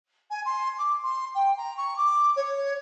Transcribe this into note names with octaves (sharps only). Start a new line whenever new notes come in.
G#5
C6
D6
C6
G5
A#5
C#6
D6
C#5